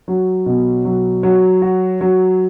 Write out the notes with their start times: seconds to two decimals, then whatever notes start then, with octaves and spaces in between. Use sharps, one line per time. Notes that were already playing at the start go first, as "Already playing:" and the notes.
0.08 F#3
0.46 B2
0.85 F#3
1.23 F#3
1.62 F#4
2.01 F#3